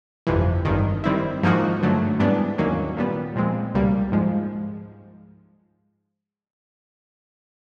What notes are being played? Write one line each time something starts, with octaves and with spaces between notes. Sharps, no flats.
G1 F2 C3 E3
G#1 G2 D#3
D#3 G3 C4 E4
G#2 F3 A#3 D#4 F#4
G2 D3 F#3 A3
G#2 E3 G3 B3 D4
D#2 D#3 F#3 A#3 C#4
A#2 G3 B3
A#2 F3 G#3 C4
C#2 B2 G3 A#3
G#2 F3 G#3